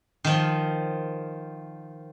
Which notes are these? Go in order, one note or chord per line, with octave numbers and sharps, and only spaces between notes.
D#3 F3